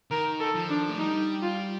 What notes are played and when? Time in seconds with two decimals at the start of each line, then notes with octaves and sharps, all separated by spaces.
0.11 D#3 A#4
0.40 A4
0.55 F3
0.70 D4
0.89 A3
0.99 G3 D#4
1.43 F4